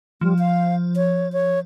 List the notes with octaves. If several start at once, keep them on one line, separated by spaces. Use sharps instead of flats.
F3 G3
F5
C#5
C#5